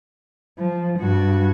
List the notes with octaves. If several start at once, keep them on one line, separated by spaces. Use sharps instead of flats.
F3
G2 F#4